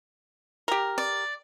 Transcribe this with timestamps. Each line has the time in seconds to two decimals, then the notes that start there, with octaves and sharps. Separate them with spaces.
0.68 G4 A#4
0.98 D5